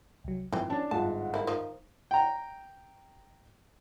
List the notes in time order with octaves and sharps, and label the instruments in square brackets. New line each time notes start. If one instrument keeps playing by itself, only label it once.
[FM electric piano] C2 F#3
[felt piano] G#1 [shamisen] E3 G5 [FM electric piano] F3
[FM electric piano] C#4 [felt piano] D4 A5
[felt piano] G1 G#2 [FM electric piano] F4 F#5 [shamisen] A5
[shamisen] A#3 E4
D#3 F3
[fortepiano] G5 A#5